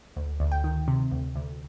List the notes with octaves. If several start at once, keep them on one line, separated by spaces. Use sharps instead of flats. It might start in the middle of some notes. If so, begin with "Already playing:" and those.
D2
D2
G5
D#3
C3
D2
D2